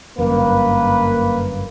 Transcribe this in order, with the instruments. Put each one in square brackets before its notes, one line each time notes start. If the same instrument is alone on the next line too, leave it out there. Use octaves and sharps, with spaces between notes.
[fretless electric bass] G1 F#2 [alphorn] A#3 [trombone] B4